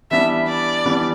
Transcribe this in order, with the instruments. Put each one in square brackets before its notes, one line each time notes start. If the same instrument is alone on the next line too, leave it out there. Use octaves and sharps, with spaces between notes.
[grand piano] E3 G3 B3 D4 [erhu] E5
[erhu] D5
[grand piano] E3 G3 B3 D4